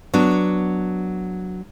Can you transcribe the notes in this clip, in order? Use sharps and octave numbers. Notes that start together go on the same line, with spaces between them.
F#3 B3 D4